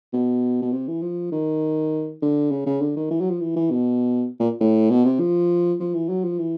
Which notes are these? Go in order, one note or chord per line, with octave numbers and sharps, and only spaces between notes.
B2
B2
C3
E3
F3
D#3
D3
C#3
C#3
D3
D#3
E3
F#3
F3
E3
E3
B2
A#2
A2
B2
C3
F3
F3
E3
F#3
F3
E3